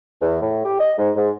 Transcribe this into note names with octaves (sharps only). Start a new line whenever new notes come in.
E2
A2
G4
D#5
G#2
G#2